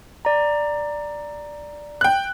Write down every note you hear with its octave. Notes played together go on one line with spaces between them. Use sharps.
D5 A#5
G5 F#6